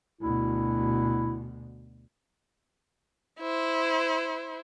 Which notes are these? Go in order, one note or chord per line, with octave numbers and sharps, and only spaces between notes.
D2 B2 E4
E4 C5